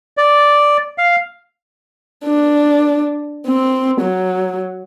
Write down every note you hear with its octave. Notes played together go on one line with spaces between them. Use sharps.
D5
F5
D4
C4
F#3